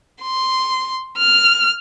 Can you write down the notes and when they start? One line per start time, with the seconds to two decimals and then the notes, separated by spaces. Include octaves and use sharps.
0.22 C6
1.18 F6